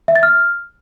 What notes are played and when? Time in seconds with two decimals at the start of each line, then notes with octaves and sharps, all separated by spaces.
0.08 E5
0.15 A6
0.23 F6